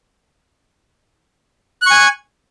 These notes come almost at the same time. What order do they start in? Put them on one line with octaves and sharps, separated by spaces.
F#6 C#6 G#5